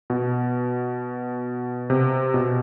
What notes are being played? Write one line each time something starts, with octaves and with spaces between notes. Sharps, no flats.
B2
C3
B2